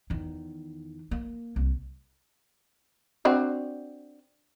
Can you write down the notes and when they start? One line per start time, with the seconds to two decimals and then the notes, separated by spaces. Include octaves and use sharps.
0.10 E2 D#3
1.11 A#3
1.56 C2
3.25 C4 D4 F#4